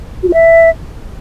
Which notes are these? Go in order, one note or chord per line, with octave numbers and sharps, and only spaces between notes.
F#4
F4
E5